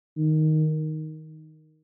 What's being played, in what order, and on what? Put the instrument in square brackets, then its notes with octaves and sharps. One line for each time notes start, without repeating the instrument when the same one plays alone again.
[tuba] D#3